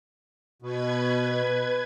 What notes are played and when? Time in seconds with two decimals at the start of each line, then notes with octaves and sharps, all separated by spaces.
0.62 B2 B4 G#6